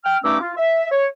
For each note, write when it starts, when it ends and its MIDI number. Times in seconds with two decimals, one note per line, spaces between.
0.05 0.17 79
0.05 0.17 89
0.23 0.38 43
0.23 0.38 57
0.23 0.38 61
0.23 0.38 63
0.23 0.38 86
0.23 0.38 88
0.41 0.53 65
0.57 0.88 76
0.92 1.07 73